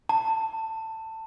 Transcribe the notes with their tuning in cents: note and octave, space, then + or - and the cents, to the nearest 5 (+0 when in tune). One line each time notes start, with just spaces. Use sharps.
A5 +20